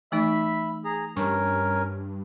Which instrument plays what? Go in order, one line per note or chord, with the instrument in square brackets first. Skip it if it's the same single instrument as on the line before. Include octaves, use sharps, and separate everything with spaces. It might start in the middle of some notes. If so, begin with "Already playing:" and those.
[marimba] E3 A3 D#4 [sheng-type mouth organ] E5 B5
[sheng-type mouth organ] G#4 A#5
[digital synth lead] G2 [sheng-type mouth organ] C#4 A#4 G#5 [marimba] C#6